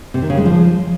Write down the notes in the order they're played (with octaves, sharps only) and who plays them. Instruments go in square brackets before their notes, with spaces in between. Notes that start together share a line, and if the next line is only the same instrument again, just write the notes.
[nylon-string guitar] C3
D#3
C#3
G#3
F3